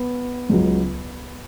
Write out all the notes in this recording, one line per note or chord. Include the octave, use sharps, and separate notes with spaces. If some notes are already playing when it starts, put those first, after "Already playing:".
Already playing: B3
C#2 C#3 F#3